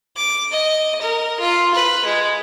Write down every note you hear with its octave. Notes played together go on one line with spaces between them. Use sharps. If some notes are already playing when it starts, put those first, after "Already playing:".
D6
D#5
A#4
F4
B4
G#3